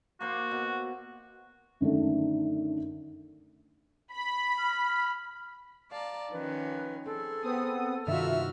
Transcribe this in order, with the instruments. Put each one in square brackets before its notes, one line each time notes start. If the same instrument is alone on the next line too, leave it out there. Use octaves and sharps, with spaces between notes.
[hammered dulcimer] A#3 C5 C6 [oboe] F#4
[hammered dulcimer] B2
[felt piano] F#2 D3 D#3 A3
[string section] B5
[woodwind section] F6
[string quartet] D5 A5 A#5 [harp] F5
[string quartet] D#3 F3 C#4 [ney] B4
[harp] C4 [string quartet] G#4 [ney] A4
[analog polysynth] B3 C4 D#6 [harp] A5
[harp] G2 C3 D#3 [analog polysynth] F4 E5 [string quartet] F#4 E6 F6